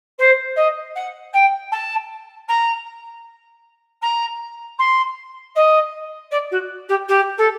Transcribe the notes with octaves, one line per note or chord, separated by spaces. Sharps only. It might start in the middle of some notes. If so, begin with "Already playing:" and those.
C5
D#5
F#5
G5
A5
A#5
A#5
C6
D#5
D5
F#4
G4
G4
A4